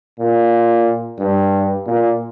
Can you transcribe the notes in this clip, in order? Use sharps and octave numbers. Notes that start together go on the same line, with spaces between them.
A#2
G2
A#2